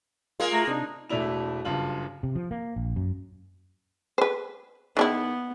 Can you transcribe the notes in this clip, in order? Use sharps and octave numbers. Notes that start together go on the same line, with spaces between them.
G#3 A#3 F4
A3 A#5
C3 D4 D#4
E1 A3 D4 E4 F7
F#1 G2 F4 F#7
C3
F3
A#3
A#1
F#2
B4 C5
D#3 B3 D4 E4